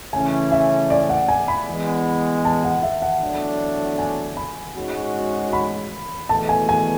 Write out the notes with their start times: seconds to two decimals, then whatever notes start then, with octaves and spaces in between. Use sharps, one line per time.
0.13 C#3 E3 A3 C#4 G#5
0.51 E5
0.90 D5
1.09 F#5
1.28 G#5
1.48 B5
1.68 E3 G#3 B3
2.45 A5
2.64 F#5
2.83 E5
3.02 F#5
3.22 E2 D3 F#3 A3 D4
3.99 G#5
4.37 B5
4.75 G#2 G#3 C#4 F#4
5.53 B5
6.29 E2 B2 A3 A5
6.49 G#5
6.69 G#5